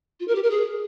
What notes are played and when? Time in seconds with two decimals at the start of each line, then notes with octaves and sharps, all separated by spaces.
0.20 F4
0.28 A#4
0.35 G4
0.43 A#4
0.50 G#4